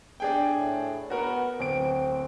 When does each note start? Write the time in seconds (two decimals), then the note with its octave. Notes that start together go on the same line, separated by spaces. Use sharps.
0.20 D4 G#4 G5
0.56 A2
1.10 B3 F#4 A#4 F#5
1.60 D1 C4 D7